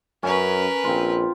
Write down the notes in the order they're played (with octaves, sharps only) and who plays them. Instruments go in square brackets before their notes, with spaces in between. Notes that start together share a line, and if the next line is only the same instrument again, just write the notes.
[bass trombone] F#2 [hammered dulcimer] C#4 [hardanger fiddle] A#4 B4
[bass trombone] A#1 [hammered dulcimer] C4 F4